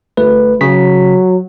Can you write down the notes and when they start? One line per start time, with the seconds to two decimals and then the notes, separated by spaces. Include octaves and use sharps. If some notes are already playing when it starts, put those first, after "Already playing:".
0.17 G1 A3 B4
0.61 C#3 F#3 B6